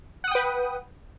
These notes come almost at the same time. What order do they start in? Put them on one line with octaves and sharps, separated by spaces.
F#5 D#6 G5 B4